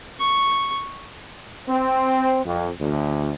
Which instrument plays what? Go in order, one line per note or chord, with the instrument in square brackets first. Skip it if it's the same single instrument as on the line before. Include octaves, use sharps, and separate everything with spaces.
[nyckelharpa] C#6
[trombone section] C4
F2
D2